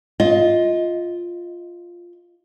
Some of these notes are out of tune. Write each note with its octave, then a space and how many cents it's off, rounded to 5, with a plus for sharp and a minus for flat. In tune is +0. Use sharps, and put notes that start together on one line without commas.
F4 +0 D#5 +20